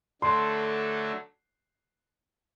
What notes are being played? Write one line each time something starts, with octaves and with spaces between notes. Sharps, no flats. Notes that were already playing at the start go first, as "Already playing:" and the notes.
D3 F#3 A3 D4 A4 C6